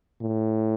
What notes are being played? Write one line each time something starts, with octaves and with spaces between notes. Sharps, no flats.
A2